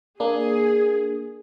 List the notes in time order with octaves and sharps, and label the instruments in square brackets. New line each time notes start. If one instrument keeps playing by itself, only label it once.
[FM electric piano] A#3 D4 [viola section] G#4